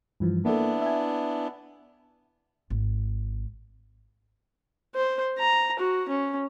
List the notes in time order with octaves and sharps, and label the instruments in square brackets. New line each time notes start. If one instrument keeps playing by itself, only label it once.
[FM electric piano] G2 E3 F3
[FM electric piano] A#3 A4 [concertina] B3 D4 E4
[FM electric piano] E5 G#5
[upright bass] G#1
[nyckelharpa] C5
A#5
F#4
C#4